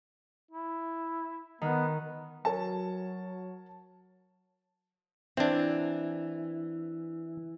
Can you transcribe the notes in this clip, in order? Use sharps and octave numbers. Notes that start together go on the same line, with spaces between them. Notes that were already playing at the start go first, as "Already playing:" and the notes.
E4
D#3 B3
F#3 A#4 C#5 A5
E3 C4 D4